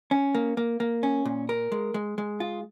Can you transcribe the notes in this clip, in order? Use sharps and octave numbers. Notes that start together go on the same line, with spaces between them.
C#4
A#3
A#3
A#3
C#4
A#2
A#4
G#3
G#3
G#3
F4